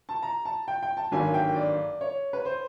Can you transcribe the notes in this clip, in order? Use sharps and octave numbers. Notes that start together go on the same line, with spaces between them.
A5
A#5
A5
G5
G5
A5
G#1 G2 D3 F#3 A#3 G#5
G5
D5
C#5
B4
C5